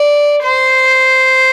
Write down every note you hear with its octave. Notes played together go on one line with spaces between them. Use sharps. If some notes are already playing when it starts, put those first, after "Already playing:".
Already playing: D5
C5